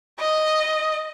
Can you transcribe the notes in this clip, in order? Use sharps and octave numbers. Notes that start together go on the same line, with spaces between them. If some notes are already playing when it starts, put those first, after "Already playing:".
D#5